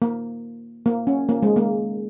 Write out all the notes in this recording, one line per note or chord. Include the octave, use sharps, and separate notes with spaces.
A#3
A#3
C#4
A#3
G#3
A#3